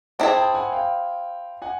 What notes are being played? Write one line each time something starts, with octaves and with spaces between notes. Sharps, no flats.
C4 E4 G#4 G5 A5
G5 A5
F#5 G#5
F5 G5
F#5 G#5